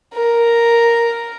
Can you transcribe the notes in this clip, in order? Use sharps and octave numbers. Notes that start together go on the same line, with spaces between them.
A#4